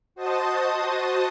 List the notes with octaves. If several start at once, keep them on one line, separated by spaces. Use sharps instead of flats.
F#4 C5 D#5 A5 D#6